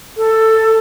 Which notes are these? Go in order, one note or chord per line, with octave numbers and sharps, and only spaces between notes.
A4